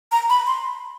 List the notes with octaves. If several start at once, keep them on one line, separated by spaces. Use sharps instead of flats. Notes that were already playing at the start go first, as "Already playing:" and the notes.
A#5
B5
C6